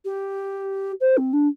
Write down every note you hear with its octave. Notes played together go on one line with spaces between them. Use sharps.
G4
C5
C4
D4